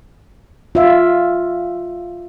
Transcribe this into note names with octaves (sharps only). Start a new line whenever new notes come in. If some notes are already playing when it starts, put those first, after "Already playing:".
F4 E5